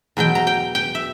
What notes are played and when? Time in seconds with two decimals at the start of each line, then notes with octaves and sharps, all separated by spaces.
0.17 E2 B2 F#3 G5
0.35 A#5
0.47 G5
0.75 G5
0.95 E5